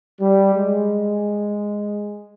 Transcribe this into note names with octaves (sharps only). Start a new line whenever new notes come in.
G3
G#3